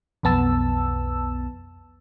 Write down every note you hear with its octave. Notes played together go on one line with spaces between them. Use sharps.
B1 F2 B3 A5 E6